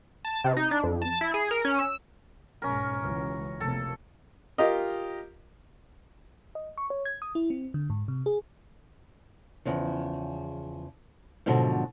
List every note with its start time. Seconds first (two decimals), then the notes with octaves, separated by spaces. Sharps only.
0.25 A5
0.44 C3
0.57 D#4
0.71 D4
0.83 F2
1.02 A5
1.21 E4
1.34 G#4
1.51 A#4
1.65 C#4
1.79 E6
2.62 B1 G#2 C#4 A#4
3.01 C#2 E3 F#3
3.60 F1 C3 A#3 A4
4.58 F4 G4 A#4 D#5
6.55 D#5
6.78 C#6
6.90 C#5
7.05 G#6
7.22 D#6
7.35 E4
7.50 C4
7.74 D3
7.90 G#2
8.08 C3
8.26 G#4
9.65 E2 C#3 F3
11.46 G#2 B2 D3 F3 F#3